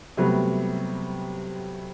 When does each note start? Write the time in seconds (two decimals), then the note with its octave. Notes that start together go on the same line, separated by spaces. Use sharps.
0.17 C3 F#3 G3 A3 B3